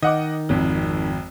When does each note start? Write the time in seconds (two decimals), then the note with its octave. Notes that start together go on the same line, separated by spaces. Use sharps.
0.03 D#3 D#5 F#5 D6
0.49 G#1 F2